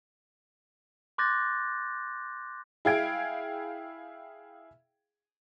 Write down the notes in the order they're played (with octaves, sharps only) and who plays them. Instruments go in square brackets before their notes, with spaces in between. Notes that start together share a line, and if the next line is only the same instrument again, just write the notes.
[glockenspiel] C6 D6 F#6 G6 A6 A#6
[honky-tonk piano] E4 G#4 F5 G5 G#6 D7